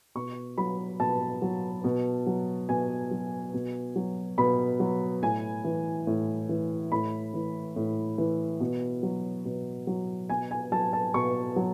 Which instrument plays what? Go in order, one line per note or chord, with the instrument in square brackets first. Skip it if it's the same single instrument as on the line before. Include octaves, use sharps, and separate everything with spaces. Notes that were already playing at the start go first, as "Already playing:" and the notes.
[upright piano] B2 C#6
F#3 B5
B2 A5
F#3
B2
F#3
B2 G#5
F#3
B2
F#3
B2 B5
F#3
A2 G#5
E3
A2
E3
A2 B5
E3
A2
E3
B2
F#3
B2
F#3
B2 G#5
G#5
F#3 A5
A5
B2 C#6
F#3